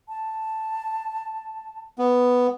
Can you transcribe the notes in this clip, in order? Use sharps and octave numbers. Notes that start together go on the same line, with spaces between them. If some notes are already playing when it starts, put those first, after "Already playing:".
A5
B3